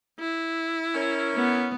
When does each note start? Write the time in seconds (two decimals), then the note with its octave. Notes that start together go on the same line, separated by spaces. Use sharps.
0.19 E4
0.95 C#4 A#4
1.35 B3